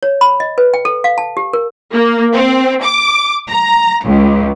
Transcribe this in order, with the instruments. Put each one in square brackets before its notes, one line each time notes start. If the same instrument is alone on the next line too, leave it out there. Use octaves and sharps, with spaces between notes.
[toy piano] C#5
B5
D#5
B4
G5
A4
F5
A5
G4
A#4
[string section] A#3
C4
D6
A#5
C#2